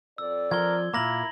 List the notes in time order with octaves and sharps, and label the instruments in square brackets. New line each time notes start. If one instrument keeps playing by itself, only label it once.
[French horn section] F2 A4 D5 [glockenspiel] E6
[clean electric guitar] F3 [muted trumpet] A#4 [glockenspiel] G#6 G7
[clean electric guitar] A#2 A#3 [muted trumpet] E4 [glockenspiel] A#5 A#6 F#7